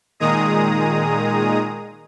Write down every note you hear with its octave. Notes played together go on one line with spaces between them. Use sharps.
A#2 D#3 G#3 G#4 A#5 D#6